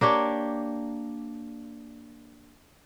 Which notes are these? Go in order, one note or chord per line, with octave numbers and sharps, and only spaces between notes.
A#3 D4 G4 C#5